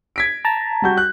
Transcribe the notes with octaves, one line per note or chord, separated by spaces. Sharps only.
G#6 B6 D7
A5 A#5
G3 F#4 G6
F#6